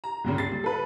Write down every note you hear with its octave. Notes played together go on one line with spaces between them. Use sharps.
A#5
C#2 A#2 C#3
A6 C7
G3
A4 B4